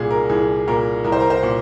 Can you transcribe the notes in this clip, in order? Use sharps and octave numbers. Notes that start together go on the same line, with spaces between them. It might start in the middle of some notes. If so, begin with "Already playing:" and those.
Already playing: C2 A#2 G#4
A#4
C2 G#4
A#2 A#4
C2 A#4
C5
A#4
C5
A#2